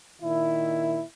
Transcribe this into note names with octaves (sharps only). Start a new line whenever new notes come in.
A#2 D#3 E4